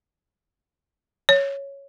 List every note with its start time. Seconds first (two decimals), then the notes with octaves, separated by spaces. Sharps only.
1.29 C#5